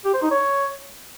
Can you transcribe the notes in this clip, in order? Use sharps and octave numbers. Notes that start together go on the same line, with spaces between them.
G4
C5
D#4
C#5